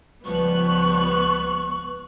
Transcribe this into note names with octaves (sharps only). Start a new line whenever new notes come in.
C#2 F3 G3 B3 C#6 F#6